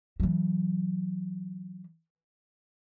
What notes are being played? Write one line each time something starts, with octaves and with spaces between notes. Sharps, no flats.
E3 F#3